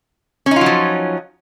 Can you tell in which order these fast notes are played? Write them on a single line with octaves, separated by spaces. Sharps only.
C#4 D#4 F4 F#3 F3